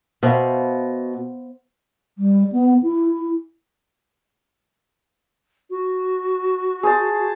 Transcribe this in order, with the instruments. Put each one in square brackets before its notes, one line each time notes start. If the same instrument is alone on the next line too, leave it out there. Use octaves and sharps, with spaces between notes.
[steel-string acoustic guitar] B2 [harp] C5 E5 F5
[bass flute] G3
B3
E4
F#4
[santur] G#4 C5 A5